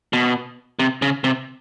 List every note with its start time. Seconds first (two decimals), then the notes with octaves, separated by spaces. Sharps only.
0.13 B2
0.79 C3
1.02 C#3
1.24 C3